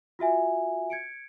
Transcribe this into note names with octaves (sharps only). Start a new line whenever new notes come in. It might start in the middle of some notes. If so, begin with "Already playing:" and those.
F4 F#4 E5 G#5
G#6 C#7 D7